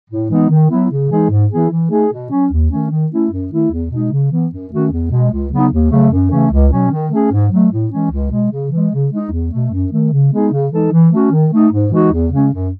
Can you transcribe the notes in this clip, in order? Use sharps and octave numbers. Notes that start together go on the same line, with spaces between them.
A2
E3 G#3 B3 D#4
D#3
F#3 B3 E4
C#3
E3 G#3 D#4 G#4
G#2
E3 B3 E4 G#4
E3
A3 D#4 G#4
B2
F#3 C#4
D#2
D#3 A3 C#4
D#3
A3 C#4 E4
F#2
D#3 A3 E4
E2
B2 G#3 D#4
C#3
E3 B3
F#2
D#3 A3 C#4 F#4
E2
B2 G#3
C#2
C#3 F#3 B3 D#4
D#2
C#3 F#3 A3
F#2
C#3 E3 A3 C#4
C#2
B2 F#3 C#4
D#3
A3 C#4 G#4
G#2
F#3 A3
A2
E3 G#3 C#4
C#2
B2 G#3
C#3
E3 G#3
C#3
G#3 D#4
E2
B2 A3
F#2
D#3 A3
C#3
G#3 B3 D#4 G#4
C#3
E3 G#3 D#4 A4
E3
A3 C#4 F#4
D#3
A3 D#4
G#2
E3 G#3 D#4 F#4
E2
C#3 G#3 C#4
F#2